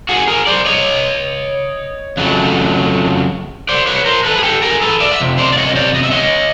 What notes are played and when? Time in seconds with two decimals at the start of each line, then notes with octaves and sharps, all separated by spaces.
0.09 F#4 G#4
0.28 G#4 A#4
0.47 C5 D5
0.65 C#5 D#5
2.17 F2 C#3 F#3 A3
3.69 C5 D5
3.87 B4 C#5
4.06 A#4 C5
4.24 A4 B4
4.38 G#4
4.43 G4 A4
4.62 G#4 A#4
4.82 A4 B4
5.00 D5 E5
5.12 E5
5.20 F2 C3
5.38 C5 D5
5.52 D5
5.57 C#5 D#5
5.76 C5 D5
5.95 D#5
6.03 E5
6.11 C#5 D#5